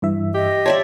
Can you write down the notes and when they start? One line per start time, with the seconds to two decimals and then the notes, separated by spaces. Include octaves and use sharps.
0.02 G2 E3 E5
0.34 G4 D#5
0.66 C#5 D5 E5 G5 A5 C6